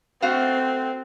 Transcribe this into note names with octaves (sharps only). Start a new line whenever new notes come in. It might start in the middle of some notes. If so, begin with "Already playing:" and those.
A3 C4 F#4 F5